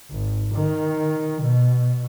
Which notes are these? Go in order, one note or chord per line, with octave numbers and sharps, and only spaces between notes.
G#1
D#3
B2